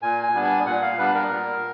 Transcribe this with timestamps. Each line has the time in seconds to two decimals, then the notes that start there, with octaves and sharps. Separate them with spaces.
0.02 A#2 G#5
0.23 G#5
0.34 G3 B3 D4
0.44 G#5
0.66 A#2 F#5
0.82 F5
0.98 G3 B3 D4 B4
1.14 A#4
1.31 A#2